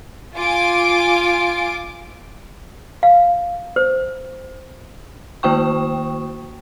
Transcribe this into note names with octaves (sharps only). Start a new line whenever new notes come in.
F4 G#5 D6 D7
F5
C5
D#3 A#3 F#4 G5 C#6